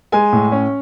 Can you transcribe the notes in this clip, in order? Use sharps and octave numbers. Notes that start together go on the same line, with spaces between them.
G#3 G#5
A2
C#4